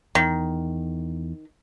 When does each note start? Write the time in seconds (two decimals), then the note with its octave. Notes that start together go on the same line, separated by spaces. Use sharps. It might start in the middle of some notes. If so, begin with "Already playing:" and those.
0.15 E2 D#3